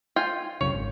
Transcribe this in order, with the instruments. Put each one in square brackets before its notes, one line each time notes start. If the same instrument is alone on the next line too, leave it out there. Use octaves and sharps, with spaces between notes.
[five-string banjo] F4 G5 G#5
[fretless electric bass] C2 F#2 C#3 [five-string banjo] C#5
[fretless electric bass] G#1